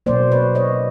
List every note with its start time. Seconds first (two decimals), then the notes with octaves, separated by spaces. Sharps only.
0.06 B2 F#3 A#3 C5 D5
0.31 B4 C#5
0.55 C#5 D#5